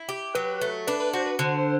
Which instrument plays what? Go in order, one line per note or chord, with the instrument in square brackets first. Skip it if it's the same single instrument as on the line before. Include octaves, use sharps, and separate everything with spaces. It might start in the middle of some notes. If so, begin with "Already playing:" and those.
Already playing: [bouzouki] E4
G4
[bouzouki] F#3 [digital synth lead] B4
[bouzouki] A3
[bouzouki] D4 [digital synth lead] B4
[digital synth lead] B4
[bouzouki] F#4 [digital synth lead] C5
[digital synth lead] B4
[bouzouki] D3 [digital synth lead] C5